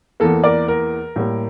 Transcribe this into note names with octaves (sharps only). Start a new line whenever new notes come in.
E2 E3 A#3 A4
A#4 D5
A#4
A2 G3 A#3